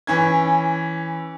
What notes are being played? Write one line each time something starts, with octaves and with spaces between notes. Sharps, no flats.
E3 C#4 G#6